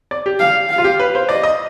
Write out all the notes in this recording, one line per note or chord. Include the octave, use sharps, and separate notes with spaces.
D5
G4
F5
F5
F4
G4
B4
C5
D5 D#5
D#5